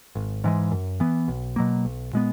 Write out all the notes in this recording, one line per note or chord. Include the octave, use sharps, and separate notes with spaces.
G#1
G#2 E3 G#3
F#2
E3 B3
B1
B2 F#3 A#3
B1
A#2 G#3 B3